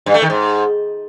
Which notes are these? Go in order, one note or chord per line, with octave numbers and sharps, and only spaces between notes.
G2
A3
D#3
G#2